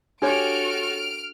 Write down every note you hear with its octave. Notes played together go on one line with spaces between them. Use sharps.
D4 F#4 G4 A4 C#5 F6 D7